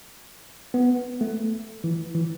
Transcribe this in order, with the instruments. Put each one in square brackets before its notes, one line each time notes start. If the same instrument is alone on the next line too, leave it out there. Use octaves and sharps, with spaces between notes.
[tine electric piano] B3
A3
E3
E3